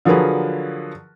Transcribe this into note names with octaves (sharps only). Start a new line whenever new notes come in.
D3 F3 F#3 G#4 A#4 B4